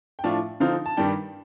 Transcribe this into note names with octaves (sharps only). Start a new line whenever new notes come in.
G5
A2 F3 A3 D4 F5
D3 F3 C4 D#4 F5
A5
G2 D#3 G3 D4 G5